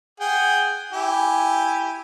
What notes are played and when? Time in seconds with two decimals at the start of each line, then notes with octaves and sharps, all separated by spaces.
0.20 G#4 F#5 G5
0.93 E4 G4 G#5